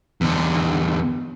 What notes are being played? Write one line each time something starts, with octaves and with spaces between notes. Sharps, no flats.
E2 D3